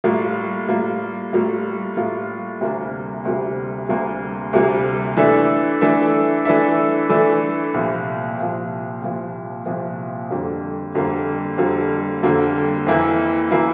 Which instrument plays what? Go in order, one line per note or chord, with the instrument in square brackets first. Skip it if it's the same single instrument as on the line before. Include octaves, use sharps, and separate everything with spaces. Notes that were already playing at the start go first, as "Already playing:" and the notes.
[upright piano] A2 G3 A#3 F4
A2 G3 A#3 F4
A2 G3 A#3 F4
A2 G3 A#3 F4
D2 C3 G3 A#3
D2 C3 G3 A#3
D2 C3 G3 A#3
D2 C3 G3 A#3
E3 A3 D4 A4 E5
E3 A3 D4 A4 E5
E3 A3 D4 A4 E5
E3 A3 D4 A4 E5
C2 A#2 F3
C2 A#2 F3
C2 A#2 F3
C2 A#2 F3
F2 D3 G3 A#3
F2 D3 G3 A#3
F2 D3 G3 A#3
F2 D3 G3 A#3
F2 E3 A#3 E4
E3 A#3 E4